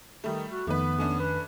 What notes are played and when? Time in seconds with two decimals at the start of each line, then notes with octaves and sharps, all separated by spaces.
0.24 D#3 G3 A3
0.50 F#4
0.67 F2 D#3 A3 B3 B4
0.98 A3 C#4 D4
1.20 B4